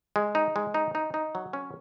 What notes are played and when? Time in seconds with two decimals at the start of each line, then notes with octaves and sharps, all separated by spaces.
0.16 G#3
0.35 D#4
0.56 G#3
0.74 D#4
0.95 D#4
1.14 D#4
1.35 F#3
1.53 C#4